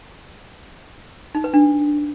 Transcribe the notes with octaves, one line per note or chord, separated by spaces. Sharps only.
D#4
B4
D4